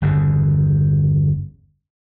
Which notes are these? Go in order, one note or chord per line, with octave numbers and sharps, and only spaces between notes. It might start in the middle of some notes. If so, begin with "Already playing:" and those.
G1 E2 C#3